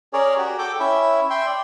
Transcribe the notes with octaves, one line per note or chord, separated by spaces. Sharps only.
C#4 G#4 A#4 C#5 D5
F#4 G4
A4 G5 D6
C#4 E4 E5
E5 G5 C6
D5